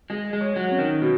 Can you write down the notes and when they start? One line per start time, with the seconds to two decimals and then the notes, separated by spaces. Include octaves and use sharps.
0.10 G#3 G#4
0.33 G#3
0.41 C#5
0.56 F#3
0.71 C#4
0.79 D#3
1.02 B2 F#3